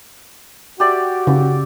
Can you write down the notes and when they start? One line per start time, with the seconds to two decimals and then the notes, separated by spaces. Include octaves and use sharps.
0.80 F#4 G4 D5 E5
1.27 C#3